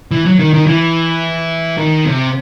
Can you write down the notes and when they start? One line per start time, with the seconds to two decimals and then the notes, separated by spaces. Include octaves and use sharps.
0.11 E3
0.26 F#3
0.39 D#3
0.54 D#3
0.67 E3
1.78 D#3
2.06 C3